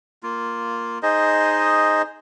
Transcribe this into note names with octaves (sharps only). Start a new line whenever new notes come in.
A#3 F4
D#4 G#4 C5 D#5